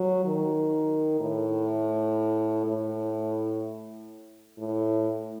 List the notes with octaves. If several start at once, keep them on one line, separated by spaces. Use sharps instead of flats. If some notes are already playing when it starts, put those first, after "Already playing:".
Already playing: F#3
D#3
A2
A2
A2